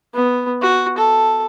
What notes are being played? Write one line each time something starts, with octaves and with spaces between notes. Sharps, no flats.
B3
F#4
A4